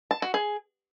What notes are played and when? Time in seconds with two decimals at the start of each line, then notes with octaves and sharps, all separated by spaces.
0.11 A5
0.22 F#4
0.34 G#4